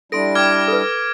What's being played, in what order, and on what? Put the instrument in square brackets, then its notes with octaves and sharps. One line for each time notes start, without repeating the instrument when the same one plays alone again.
[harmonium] G3 D4 E4 [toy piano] A4 C6 [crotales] A#6 D7
[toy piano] G5 [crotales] D6 F6 G#6
[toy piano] A4 B4